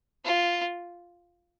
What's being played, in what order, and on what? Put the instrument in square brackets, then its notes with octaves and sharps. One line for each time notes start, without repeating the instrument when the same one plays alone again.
[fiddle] F4